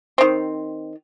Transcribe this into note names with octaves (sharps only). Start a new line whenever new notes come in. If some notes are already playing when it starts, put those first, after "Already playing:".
D#3 C4